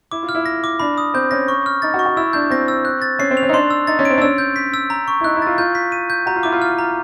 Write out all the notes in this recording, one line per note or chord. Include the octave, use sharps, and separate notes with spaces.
E4 D6
F4
F6
E4
A#6
D6
D4 B5
D#6
C4 G6
C#4 A#6
C#6
F6
D#4 A6
F#4
C#6
F#4
E4 E6
D4 G6
C4 A#6
E6
F#6
A6
C#4 C7
C4
F7
C#4
D#4
D4 C6
E6
D#4 A6
C#4
C4 D7
D4
C#4 E6
G6
B6
E6
A#5
C#6
E4
D#4 F#6
E4
F4 A6
F4 G6
B6
D#7
G6
F#4 A#5
F4
E4 D6
F4
F6
A#5